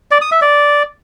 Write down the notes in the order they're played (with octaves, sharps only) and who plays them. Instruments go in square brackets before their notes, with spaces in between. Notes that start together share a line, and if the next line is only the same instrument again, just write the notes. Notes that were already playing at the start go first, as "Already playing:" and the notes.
[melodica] D5
D#6
E5
D5